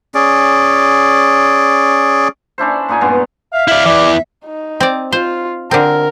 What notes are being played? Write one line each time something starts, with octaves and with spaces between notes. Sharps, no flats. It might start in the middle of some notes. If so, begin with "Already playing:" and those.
C#4 G#4 D5
C#4 D4 E4 C5
A#2 D#4 G#5
G2 B2 G#3 B3
E5 F5
E4 D5 E5
E2 E3 D5
D#4
C4 D5
F4 C5
D3 C4 A#4